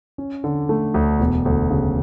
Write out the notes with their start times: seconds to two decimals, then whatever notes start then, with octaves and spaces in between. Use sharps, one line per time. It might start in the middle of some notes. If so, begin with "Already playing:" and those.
0.18 C#4
0.44 D3
0.69 A3
0.94 D2
1.20 E1
1.46 D2
1.71 C#3